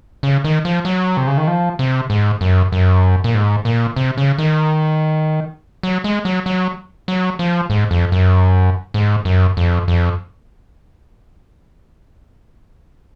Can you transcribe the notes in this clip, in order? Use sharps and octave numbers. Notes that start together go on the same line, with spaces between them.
C#3
D#3
F3
F#3
C3
C#3
D#3
F3
C3
G#2
F#2
F#2
A#2
G#2
A#2
C3
C#3
D#3
F#3
G#3
F#3
F#3
F#3
F3
G#2
F2
F#2
G#2
F#2
F2
F2